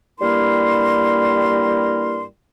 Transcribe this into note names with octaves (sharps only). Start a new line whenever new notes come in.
G2 G3 A#3 E4 A#4 C6